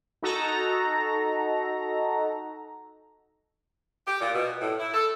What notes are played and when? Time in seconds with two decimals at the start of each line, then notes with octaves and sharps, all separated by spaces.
0.23 D#4 F#4 A4 A#5
4.07 G4
4.20 A#2
4.34 B2
4.60 A2
4.79 E4
4.94 A4